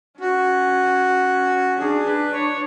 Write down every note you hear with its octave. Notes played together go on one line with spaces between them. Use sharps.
C#4 F#4
D4 G#4
B4
C#5